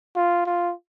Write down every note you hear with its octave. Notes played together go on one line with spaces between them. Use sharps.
F4
F4